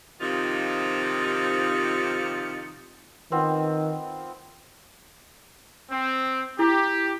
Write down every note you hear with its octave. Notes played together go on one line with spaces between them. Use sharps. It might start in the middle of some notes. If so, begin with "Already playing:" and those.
C3 D#3 F3 D#4 F4
D#3 B3 C4 F4
C4
E4 G4